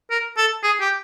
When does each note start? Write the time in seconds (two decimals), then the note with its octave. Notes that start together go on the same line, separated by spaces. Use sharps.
0.11 A#4
0.37 A4
0.63 G#4
0.80 G4